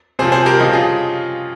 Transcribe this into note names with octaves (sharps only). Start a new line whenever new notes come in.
C3 F3 G#4 C5
G#4 C5
G4 A#4
C#3 F3 D#4 G4
F4 G#4